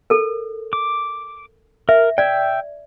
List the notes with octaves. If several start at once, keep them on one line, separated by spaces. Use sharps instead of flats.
A4 A#4
D6
A#4 E5
D5 E5 G5